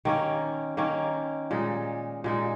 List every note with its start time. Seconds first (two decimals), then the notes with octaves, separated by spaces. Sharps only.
0.05 D#3 A#3 C#4
0.77 D#3 A#3 C#4
1.51 A#2 G#3 D#4
2.24 A#2 G#3 D#4